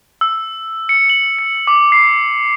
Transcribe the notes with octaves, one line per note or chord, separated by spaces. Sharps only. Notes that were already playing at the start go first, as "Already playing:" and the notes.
E6
C#7
F#7
C#7
D6
C7